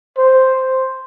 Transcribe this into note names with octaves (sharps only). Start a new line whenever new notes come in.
C5